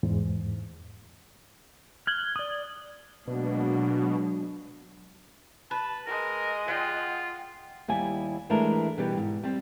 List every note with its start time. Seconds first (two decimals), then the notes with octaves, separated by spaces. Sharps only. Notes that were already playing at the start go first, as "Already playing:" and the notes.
0.03 E2 G#2
2.07 F6 F#6 G#6 F#7 G7
2.36 D5 D#6
3.28 B2 F#3 G#3 A#3 D4
5.71 B4 A5
6.07 G#3 A#4 D#5
6.68 F4 F#5 G5
7.88 D#2 G3 E4 G#5
8.50 E3 G#3 A3 D4 E4 A#4
8.98 B2 E3 G3 G4
9.17 G#2
9.44 G3 C4